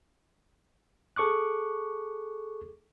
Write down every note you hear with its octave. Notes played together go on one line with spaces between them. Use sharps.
G#4 A4 C#6 D6 F#6